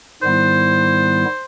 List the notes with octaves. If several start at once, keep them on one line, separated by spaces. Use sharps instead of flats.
G#2 D#3 G3 B3 E4 C5